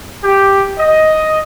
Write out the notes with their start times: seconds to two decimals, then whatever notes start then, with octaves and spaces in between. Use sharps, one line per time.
0.24 G4
0.78 D#5